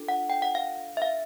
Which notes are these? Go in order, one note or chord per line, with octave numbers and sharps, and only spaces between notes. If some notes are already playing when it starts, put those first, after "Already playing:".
Already playing: D4 F4 A4
F#5
G5
F#5
F5
E5
F5